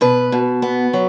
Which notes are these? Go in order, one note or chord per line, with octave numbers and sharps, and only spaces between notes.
B2 B4
B2
B3
F#3